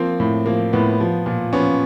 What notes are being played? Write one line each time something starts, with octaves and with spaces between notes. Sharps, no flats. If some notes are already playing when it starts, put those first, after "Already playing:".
Already playing: F3 A#3 C4
A2
F3 A#3
A2 B3
F3
A#2
F3 B3 C#4